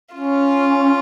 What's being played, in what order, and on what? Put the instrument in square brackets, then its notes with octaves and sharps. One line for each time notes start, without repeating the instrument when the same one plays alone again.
[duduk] C#4 [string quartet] F4